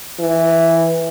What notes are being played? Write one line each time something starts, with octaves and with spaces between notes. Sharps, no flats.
E3